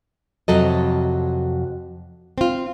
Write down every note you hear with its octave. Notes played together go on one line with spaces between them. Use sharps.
F2 C3 F#3 A4 D#5
C4 F4